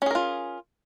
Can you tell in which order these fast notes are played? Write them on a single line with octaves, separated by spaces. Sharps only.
C#4 G#4 A#4 F4